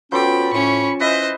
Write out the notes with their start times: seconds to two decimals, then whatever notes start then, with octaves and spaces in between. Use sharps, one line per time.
0.12 F3 B3 C#4 F#4 A4 G5 B5 D6
0.53 A2 C#4 C#6
1.00 E3 C#4 B4 C5 D#5 E5 A#6